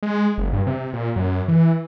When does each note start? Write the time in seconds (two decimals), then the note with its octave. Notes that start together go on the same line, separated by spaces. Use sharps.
0.03 G#3
0.38 F#1
0.53 G2
0.67 C3
0.93 A#2
1.16 F#2
1.48 E3